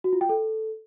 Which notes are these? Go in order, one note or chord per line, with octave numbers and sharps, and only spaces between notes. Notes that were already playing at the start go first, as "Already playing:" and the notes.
F#4
F4
G5
A4